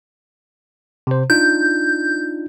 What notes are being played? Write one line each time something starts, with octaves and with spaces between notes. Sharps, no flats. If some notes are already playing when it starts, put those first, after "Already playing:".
C3 C5
D4 D#4 F4 G6